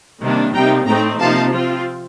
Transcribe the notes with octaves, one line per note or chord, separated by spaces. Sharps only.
C3 D#3 G3 A#3 D4
C3 G3 A#3 D#4 G5 A#5
A2 A3 C4 D#4 G5 A#5
C3 F3 A#3 D#4 F5 A5
F3 C4 F4